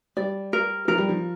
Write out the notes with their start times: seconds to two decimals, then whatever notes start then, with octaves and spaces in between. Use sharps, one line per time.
0.17 G3 D5
0.53 A#4
0.88 F3 A#4
0.98 G3
1.09 F3